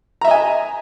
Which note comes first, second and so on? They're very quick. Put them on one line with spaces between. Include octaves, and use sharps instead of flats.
A#5 E5 D#5 G#5